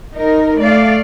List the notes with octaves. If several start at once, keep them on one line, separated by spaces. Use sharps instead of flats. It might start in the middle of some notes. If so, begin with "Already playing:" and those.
D#4 A#4
A3 D5 F5